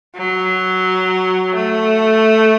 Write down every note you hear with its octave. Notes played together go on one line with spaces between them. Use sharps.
F#3
A3